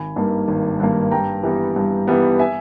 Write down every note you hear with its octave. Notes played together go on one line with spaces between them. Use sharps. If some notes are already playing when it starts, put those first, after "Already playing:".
Already playing: G#1 G#5 B5
G2 D#3 A#3
G#1
G2 D#3 A#3
G2 G5 A#5
E3 G3 B3
G2
E3 G3 B3
E5 G#5